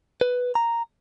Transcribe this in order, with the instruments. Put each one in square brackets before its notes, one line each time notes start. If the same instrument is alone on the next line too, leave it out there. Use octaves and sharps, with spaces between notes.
[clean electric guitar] B4
A#5